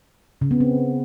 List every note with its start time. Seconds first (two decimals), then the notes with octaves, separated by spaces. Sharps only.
0.41 C#3
0.51 B3
0.60 C4